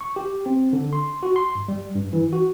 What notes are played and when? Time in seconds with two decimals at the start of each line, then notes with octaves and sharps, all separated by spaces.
0.01 C#6
0.16 G4
0.46 C4
0.73 D3
0.93 C6
1.23 F#4
1.36 C6
1.55 G2
1.68 G3
1.95 G2
2.13 E3
2.33 F#4